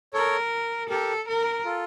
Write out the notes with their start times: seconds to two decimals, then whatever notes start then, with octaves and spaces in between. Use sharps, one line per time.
0.13 A4 A#4 C#5
0.89 G4 A4 A#4
1.28 A#4
1.65 F4 A4